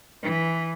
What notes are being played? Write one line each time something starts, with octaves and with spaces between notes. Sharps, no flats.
E3